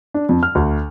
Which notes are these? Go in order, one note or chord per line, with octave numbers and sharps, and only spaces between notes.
D4
F2
F6
D2